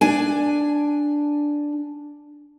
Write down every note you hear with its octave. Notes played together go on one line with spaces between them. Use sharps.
D4 G#5